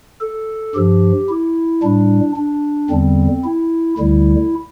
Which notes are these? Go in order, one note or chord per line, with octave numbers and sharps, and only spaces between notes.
A4
G2 F3 G4
E4
A2 G3 D4
D4
E2 D3 G3 C4
E4
D2 D3 G3 E4